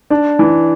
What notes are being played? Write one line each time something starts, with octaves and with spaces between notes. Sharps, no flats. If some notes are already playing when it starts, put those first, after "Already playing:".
D4
E3